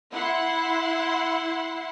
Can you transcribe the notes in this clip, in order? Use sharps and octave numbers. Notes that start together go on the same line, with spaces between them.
E4 F#5 C6